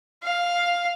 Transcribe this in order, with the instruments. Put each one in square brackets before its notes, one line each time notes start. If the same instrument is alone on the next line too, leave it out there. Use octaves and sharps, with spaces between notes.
[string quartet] F5